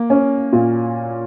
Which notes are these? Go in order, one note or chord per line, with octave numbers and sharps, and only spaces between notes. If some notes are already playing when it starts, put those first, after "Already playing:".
Already playing: A#3
C#4
A#2